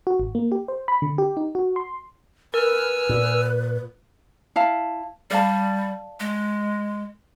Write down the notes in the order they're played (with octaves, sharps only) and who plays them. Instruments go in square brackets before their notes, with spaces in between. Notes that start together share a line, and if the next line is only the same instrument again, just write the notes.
[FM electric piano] F#4
G#1
A#3
G4
C5
B5
D3
G4
D#4
F#4
C6
[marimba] A#4 [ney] B4 [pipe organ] G#5 E6 F6
[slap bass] A#2
[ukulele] E4 F5 A5
[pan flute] G3 [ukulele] D5 F5 A5
[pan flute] G#3